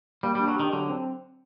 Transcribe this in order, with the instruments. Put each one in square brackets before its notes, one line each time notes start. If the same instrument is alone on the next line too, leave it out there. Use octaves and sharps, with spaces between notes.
[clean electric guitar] G3 [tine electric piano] A#3
[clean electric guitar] G3
[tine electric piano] D4
[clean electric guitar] F#3
[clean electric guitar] D#3 [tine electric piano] G4
[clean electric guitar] D3 [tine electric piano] F#3
[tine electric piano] C4